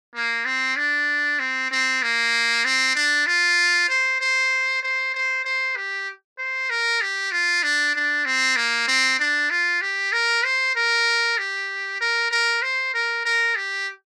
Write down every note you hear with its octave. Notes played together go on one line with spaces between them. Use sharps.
A#3
C4
D4
C4
C4
A#3
C4
D4
F4
C5
C5
C5
C5
C5
G4
C5
A#4
G4
F4
D4
D4
C4
A#3
C4
D4
F4
G4
A#4
C5
A#4
G4
A#4
A#4
C5
A#4
A#4
G4